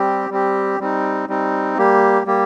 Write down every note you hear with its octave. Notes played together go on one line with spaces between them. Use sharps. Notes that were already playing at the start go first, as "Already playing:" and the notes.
Already playing: G3 C4 G4
G3 C4 G4
G3 C4 D#4
G3 C4 D#4
G3 A#3 G4
G3 A#3 G4